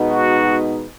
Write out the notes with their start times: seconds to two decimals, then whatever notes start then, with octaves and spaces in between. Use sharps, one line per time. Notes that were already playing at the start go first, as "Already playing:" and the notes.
Already playing: B2 G#3 B3 D#4
0.10 F#4